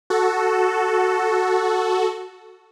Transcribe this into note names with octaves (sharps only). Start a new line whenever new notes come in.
F#4 A4